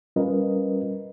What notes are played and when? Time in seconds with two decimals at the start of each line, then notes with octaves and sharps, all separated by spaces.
0.16 G3 C#4 F4 A#4 B4 D#5